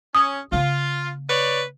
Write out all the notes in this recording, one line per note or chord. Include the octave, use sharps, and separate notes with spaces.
C#4 D#6
C#3 A#3 F4
B4 C#5 D5